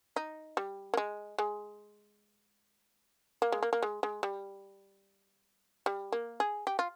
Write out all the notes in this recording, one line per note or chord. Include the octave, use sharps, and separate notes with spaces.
D#4
G3
A#3
G#3
G#3
A#3
G#3
A#3
A#3
G#3
G#3
G3
G3
A#3
G#4
G4
F4